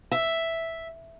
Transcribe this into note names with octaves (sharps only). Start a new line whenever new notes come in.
E5